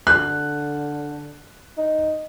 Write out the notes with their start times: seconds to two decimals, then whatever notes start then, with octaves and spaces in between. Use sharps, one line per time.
0.07 D3 F#6
1.77 D#4